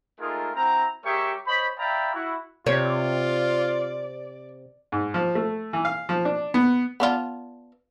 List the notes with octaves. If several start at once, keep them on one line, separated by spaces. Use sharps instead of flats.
G#3 A3 D#4 F4 G#4 A#4
C4 E4 F#4 A#5
G#3 G4 A#4 C#5 E5 C#6
C5 C#5 D#5 B5
D5 E5 F5 G5 A#5 B5
E4 F#4
C3 F4 C#5 D5
G#2
F3
A3
E3
F5
F3
D4
B3
B3 D4 F4